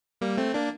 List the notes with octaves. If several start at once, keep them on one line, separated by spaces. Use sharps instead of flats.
G3 A#3
A3 C4
A#3 D4